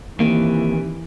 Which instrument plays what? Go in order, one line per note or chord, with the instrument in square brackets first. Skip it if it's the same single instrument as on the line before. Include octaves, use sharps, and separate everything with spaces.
[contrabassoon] C3 [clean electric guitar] D#3 [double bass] E3 [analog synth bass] A#3